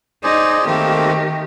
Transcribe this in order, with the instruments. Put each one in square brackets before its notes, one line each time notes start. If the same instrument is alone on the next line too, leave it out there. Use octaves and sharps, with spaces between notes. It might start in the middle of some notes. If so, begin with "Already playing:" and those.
[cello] D#4 [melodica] G#4 C5 D5
[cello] D#3 G4 [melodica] A3 A#3 C4